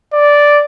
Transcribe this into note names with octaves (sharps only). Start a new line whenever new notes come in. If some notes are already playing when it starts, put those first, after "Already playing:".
D5